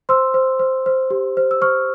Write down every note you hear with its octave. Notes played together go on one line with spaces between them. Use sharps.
C5 C6 E6
C5
C5
C5
G4
C5
E6
C5 C#6 F6